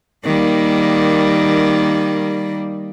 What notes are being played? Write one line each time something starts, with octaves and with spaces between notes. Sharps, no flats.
D#3 G3 A#3